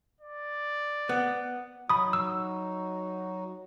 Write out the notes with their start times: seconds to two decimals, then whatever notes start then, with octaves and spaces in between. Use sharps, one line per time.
0.21 D5
1.09 B3
1.89 F#3 D#4 F#4 B5 D#6
2.13 E6